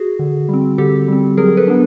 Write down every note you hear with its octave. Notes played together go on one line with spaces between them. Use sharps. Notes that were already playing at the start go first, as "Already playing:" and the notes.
Already playing: F#4 G#4
D3
G3 C4
D3 G4 A4
G3 C4
F#3 G#4 A#4
A4 B4
B3 D4